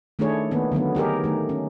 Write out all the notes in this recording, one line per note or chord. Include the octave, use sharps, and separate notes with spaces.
D#3 A3 D4 E4 G#4 C#5
D#3 A#3 B3
D3 D#3 F#3 B3
D#4 G4 G#4 A#4
D#3 A3
C#4